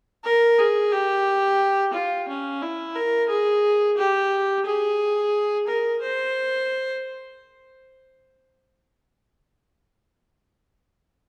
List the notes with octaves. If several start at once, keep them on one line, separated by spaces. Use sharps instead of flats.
A#4
G#4
G4
F4
C#4
E4
A#4
G#4
G4
G#4
A#4
C5